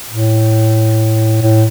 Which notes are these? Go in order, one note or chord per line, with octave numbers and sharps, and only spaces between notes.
A2
A2